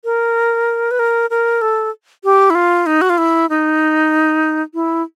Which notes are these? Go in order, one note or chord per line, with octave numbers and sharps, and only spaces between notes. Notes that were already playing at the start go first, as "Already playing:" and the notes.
A#4
B4
A#4
A#4
A4
G4
E4
F4
D#4
F#4
F4
E4
D#4
E4